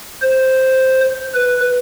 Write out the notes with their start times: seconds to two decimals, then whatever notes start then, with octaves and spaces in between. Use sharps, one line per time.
0.22 C5
1.34 B4